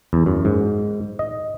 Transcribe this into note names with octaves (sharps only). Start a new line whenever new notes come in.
E2
F#2
G#2
D#5